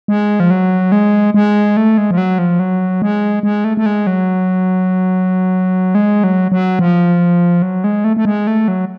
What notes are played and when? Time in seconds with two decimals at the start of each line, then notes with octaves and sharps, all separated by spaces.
0.08 G#3
0.40 F3
0.50 F#3
0.92 G#3
1.34 G#3
1.77 A3
1.98 G#3
2.11 F3
2.18 F#3
2.38 F3
2.59 F#3
3.02 G#3
3.43 G#3
3.64 A3
3.77 A3
3.86 G#3
4.07 F#3
5.95 G#3
6.24 F#3
6.52 F#3
6.79 F3
7.62 F#3
7.84 G#3
8.04 A3
8.17 A3
8.25 G#3
8.47 A3
8.68 F#3